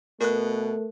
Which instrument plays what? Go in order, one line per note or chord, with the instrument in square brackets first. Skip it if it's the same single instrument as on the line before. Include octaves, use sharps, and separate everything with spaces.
[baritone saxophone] B2 [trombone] A3 [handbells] A#4 F#6